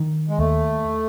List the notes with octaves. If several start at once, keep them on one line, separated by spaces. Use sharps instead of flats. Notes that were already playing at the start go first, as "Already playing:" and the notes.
Already playing: D#3
G#3
D#2 A3